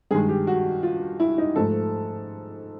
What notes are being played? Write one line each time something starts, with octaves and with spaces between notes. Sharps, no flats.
G2 D#3 G#3 G#4
G4
F#4
F4
E4
D#4
G#2 F3 A3 A4